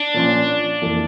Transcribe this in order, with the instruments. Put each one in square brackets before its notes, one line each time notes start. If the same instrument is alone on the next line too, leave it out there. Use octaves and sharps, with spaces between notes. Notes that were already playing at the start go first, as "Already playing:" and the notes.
Already playing: [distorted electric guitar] D4
[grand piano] A#2 F3 C#4 F4
F2 E3 A#3